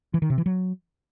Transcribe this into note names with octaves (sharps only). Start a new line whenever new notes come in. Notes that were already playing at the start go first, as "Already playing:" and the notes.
E3
D#3
C3
E3
F#3